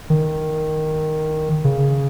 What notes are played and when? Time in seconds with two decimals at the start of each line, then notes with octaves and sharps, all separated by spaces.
0.10 D#3
1.64 C#3